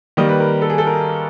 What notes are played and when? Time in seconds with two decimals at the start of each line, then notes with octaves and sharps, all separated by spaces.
0.17 D#3 G3 A#3 D#5
0.29 B4
0.40 A#4
0.62 A4
0.70 G#4
0.78 A4
0.87 A#4